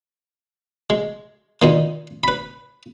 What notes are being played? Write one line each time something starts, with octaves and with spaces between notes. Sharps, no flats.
G#3
A#2 D#3 A#3
B4 B5